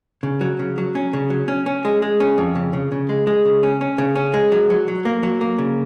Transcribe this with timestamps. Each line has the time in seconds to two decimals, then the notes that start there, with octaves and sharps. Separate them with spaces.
0.23 C#3
0.41 F#3
0.59 C#3
0.78 F#3
0.95 C#4
1.13 C#3
1.30 F#3
1.48 C#4
1.66 C#4
1.85 G#3
2.02 G#3
2.20 C#4
2.38 F2
2.55 C#3
2.73 C#3
2.92 C#3
3.09 G#3
3.27 G#3
3.45 C#3
3.63 C#4
3.81 C#4
3.98 C#3
4.16 C#4
4.34 G#3
4.52 F#3
4.70 F#3
4.88 F#3
5.05 A#3
5.23 F#3
5.41 A#3
5.58 C#3